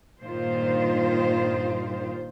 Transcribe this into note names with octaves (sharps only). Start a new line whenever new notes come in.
G2 A#2 D#3 F4 C5